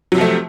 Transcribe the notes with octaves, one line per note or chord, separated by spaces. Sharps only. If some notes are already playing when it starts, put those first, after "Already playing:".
C3 F3 F#3 A3